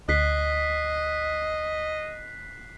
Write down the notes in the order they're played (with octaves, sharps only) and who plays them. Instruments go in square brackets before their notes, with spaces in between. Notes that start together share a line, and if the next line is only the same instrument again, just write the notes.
[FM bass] D2 [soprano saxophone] D#5 [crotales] F#6 B6 C7